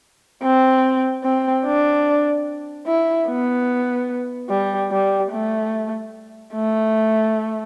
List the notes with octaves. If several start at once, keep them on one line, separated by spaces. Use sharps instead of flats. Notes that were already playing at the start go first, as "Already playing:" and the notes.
C4
C4
D4
E4
B3
G3
G3
A3
A3